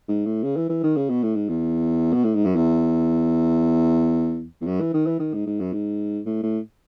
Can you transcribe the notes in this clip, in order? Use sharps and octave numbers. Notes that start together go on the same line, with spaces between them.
G#2
A2
C#3
E3
E3
D#3
C#3
B2
A2
G#2
E2
B2
A2
G#2
F#2
E2
E2
F#2
E3
D#3
E3
D#3
G#2
G#2
F#2
G#2
A2
A2